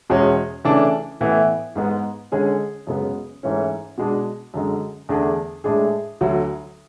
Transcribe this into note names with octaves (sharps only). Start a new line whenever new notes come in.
E2 B2 G#3 C#4
C#3 E3 A3 D4
A2 E3 B3
G#2 G#3 B3
D3 G#3 C#4 G#4
F#2 C#3 G#3 B3
G#2 E3 A3 C#4
B2 G#3 D4
F#2 D3 G#3
E2 D3 A3 D4 G#4
A2 G#3 D4 G#4
D2 D3 F#3